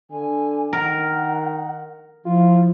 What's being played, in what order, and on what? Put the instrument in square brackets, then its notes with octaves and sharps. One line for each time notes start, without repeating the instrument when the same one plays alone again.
[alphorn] D3 [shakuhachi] G#5
[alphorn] D#3 [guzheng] A#4 [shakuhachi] F#5
[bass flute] F3 [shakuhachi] E4 [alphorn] F4